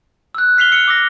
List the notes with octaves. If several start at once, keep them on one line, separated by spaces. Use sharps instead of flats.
E6 F#6
F6 B6 C7 F7 G7
E6 C#7 G7
D6 E6 A#6